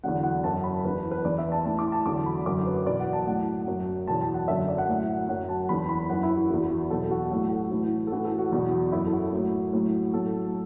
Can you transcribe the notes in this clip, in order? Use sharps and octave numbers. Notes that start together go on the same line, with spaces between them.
E2 D3 F#3 F#5
F#5
F#2 F#3 A5
B5
E2 E3 B4
B4
E2 E3 D5
E5
A5
A2 E3 A5
D6
A5
E2 D3 F#3 D6
B5
F#2 D3 F#3 D6
B4
E2 B2 F#3 D5
F#5
A5
A2 F#3 F#5
F#2 F#3
E2 B2 F#3 A5
A5
F#5
F#2 D3 F#3 E5
D5
F#5
A2 F#3
F#2 F#3 F#5
A5
E2 E3 B5
B5
F#2 E3 F#5
E4
F#4
E2 E3 F#4
F#4
E2 B2 F#3 A4
F#4
A2 F#3 F#4
A4
F#4
A2 E3
A4
A2 E3 F#4
A4
F#4
E2 B2 F#3
F#2 F#3 E4
A4
F#4
A2 F#3
A2 F#3
A2 F#3 A4